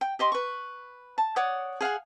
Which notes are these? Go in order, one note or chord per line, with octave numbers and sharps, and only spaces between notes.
G5
G4 D#5 C6
B4 C#6
A5
C#5 D5 F#5 D#6
G#4 F5 F#5 G#5